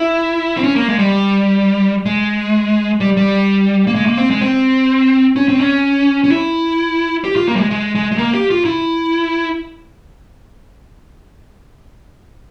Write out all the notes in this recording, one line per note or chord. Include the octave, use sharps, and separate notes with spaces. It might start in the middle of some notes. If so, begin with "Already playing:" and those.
Already playing: E4
C4
C#4
A#3
G#3
G3
G#3
G3
G3
A#3
G#3
A#3
C4
G#3
C4
C#4
C4
C#4
C#4
E4
G4
F4
A#3
G3
G#3
G#3
G#3
G#3
A#3
G4
F4
E4